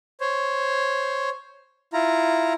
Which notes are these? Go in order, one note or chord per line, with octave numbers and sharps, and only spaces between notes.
C5 C#5
E4 F4 A#5